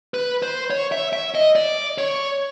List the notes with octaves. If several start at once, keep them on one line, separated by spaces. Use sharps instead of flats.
B4
C5
C#5
E5
E5
D#5
D5
C#5